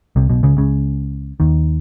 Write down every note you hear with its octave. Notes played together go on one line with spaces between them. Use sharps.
C2 C3
B1 B2
C#2 C#3
C#2 C#3
D#2 D#3